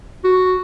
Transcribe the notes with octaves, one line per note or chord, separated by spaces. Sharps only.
F#4